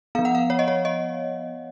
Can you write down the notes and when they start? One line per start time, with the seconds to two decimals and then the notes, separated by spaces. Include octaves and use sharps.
0.15 F3 B3 F5
0.25 F#5
0.35 F5
0.50 C#5
0.59 D#5
0.68 C#5
0.85 D#5